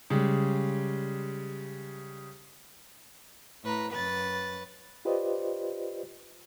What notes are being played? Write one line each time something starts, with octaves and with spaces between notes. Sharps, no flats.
C#3 G3 G#3
A2 B4 A#5
F#2 B4 A6
F4 G4 B4 C5 D5 D#5